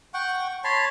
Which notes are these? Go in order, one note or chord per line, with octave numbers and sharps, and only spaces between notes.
F#5 G5 C#6
C#5 A5 B5 C6